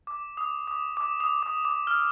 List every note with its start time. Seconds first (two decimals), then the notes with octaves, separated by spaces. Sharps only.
0.07 D6
0.37 D#6
0.67 D6
0.97 D6
1.20 D#6
1.43 D6
1.65 D6
1.87 F6